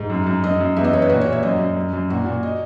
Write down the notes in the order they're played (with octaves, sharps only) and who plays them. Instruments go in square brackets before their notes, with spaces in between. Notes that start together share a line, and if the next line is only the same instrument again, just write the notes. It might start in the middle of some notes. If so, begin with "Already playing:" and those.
Already playing: [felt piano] G#2
F#2
F#2
F#2 D#5
F#2
E2 E5
D#5
E2 C#5
B4
A#2 F#4
C#5
A#2
E5
F#2 D#5
F#2
F#2
F#2
A#2 F#4
F#4
A#2
F#4
D#5